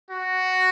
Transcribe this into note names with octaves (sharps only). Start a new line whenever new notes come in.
F#4